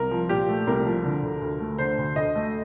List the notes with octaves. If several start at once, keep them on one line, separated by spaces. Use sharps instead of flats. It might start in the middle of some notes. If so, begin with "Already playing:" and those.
Already playing: C2 A#4
F3
A#2 G4
A3
C2 A#4
F3
D3
D2
D2
A3
D3 C5
D2
D2 D#5
A3